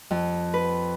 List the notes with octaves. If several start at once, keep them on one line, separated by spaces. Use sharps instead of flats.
F2
B4